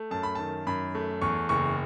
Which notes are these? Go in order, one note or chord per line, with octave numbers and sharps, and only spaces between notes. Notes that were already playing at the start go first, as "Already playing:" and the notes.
Already playing: A3
F#2 A5
B5
D#3 A5
F#2 B5
A3
E2 C#6
F#1 C#6